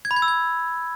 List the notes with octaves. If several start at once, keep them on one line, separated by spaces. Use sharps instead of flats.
G#6
B5
G#6
E6
G#6